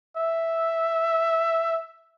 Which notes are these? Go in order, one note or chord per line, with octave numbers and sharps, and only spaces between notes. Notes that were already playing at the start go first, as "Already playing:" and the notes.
E5